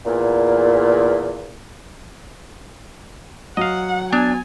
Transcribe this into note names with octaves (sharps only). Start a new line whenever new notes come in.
E2 A#2
F#3 D#5 F5 F#5
B3 D4 G#5